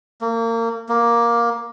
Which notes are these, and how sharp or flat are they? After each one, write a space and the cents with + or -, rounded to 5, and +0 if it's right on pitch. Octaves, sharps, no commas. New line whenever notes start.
A#3 -30
A#3 +10